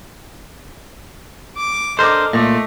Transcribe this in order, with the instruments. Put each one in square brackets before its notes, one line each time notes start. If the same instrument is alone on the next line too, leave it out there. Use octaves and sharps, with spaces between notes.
[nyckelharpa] D6
[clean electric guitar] D4 A#4 C5 [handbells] A4 D6 [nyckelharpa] D#5
[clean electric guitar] A#2 [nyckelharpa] A3 [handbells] D#5 D6